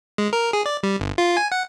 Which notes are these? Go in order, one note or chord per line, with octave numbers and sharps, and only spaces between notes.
G#3
A#4
G#4
D5
G3
G1
F4
G#5
F#5